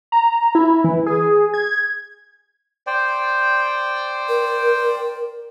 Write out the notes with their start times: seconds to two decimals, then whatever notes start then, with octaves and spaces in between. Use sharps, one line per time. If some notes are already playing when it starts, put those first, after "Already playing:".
0.12 A#5
0.55 E4
0.84 E3
1.06 G#4
1.54 G#6
2.87 C5 D5 G5
4.29 A#4